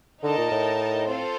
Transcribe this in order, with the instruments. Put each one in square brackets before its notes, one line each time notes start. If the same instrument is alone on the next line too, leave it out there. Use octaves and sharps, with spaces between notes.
[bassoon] D3 [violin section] D#4 A#4 D#5 A5
[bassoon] A#2
A2
[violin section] C4 F4 A4 C5